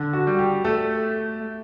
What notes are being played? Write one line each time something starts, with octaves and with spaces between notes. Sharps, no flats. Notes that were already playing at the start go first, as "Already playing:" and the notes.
Already playing: D3
F#4
G3
G4
A3 A4